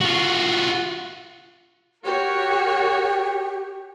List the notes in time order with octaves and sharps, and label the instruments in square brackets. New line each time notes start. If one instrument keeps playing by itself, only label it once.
[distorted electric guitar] F4 F#4
[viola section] F#4 A#4 C#5 [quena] G4